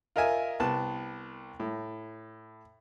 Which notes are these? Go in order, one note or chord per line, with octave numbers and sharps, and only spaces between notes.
F4 A#4 D#5 E5 G#5
C2 B3 A5
A2